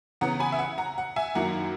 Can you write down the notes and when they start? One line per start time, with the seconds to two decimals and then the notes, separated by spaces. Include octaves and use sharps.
0.21 C#3 E3 B3 F#5 A#5
0.40 G#5 B5
0.52 E5
0.59 F#5
0.78 F#5 A#5
0.98 F#5
1.16 E5 G#5
1.35 F#2 D#3 A#3 E4 F#5 A#5